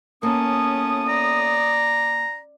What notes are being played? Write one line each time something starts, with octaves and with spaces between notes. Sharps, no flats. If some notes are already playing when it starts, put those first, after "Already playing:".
A2 A#3 B3 C#4 A5 D#6
D5 A#5